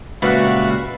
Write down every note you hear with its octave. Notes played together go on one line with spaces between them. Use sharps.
C#2 A#2 G3 F4 F#4 B4 E5 F5